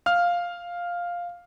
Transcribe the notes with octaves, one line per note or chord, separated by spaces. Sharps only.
F5 F6